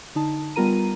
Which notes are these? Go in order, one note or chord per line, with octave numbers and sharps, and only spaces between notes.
D3 D#4 A5
G3 B3 F4 A#4 A#5 D#7